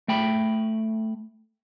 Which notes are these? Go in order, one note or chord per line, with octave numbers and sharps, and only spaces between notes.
A3 G5 B5